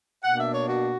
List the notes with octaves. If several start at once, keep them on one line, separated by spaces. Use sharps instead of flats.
B2 A#3 D4 F#5
E5
C#5
F#4